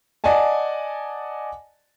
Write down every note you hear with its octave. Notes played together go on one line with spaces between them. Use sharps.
D5 D#5 F#5 G#5 A5